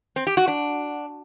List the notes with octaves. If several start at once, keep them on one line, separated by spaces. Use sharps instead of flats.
C4
G4
F#4
D4